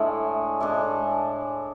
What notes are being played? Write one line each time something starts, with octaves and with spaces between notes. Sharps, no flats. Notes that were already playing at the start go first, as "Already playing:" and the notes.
Already playing: A2 G#3 D4 A4
A2 G#3 D4 A4